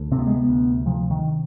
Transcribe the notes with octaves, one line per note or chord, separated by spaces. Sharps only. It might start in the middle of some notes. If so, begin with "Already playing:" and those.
Already playing: D2
C3 C4
B3
G#3
B3
D2
C3 F3
D#3